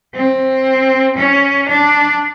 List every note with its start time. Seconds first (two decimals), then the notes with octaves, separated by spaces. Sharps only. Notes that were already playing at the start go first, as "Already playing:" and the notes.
0.15 C4
1.17 C#4
1.68 D4